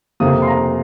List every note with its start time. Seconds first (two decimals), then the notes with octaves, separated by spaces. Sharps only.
0.20 F2 C3 F3 A#3 D#6
0.42 C6
0.48 A#5